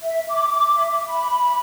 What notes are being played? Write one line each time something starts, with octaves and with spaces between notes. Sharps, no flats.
E5
D6
E5
B5